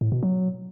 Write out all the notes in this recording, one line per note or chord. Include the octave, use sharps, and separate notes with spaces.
A2
B2
F#3